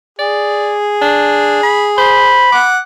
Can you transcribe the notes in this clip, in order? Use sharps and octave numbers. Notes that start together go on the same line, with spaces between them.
G#4 D5
D4
B5
C5 B5
F#5 D6